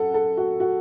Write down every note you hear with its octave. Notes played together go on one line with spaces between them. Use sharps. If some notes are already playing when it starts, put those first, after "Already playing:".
Already playing: F#2 A4 F#5
A4
F#4
F#4